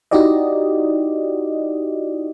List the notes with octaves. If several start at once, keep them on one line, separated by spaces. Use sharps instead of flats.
D#4 E4 F#4 G4 D5 D#5